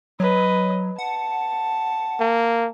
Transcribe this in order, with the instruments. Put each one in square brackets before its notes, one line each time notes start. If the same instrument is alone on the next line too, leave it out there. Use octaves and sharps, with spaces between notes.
[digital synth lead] F#3 [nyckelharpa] B4 D#5
[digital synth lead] F#5 [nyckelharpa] A5
[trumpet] A#3